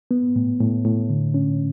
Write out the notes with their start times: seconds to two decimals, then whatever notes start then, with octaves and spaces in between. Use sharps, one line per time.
0.11 B3
0.36 A2
0.60 A2
0.85 A2
1.10 D3
1.34 C#4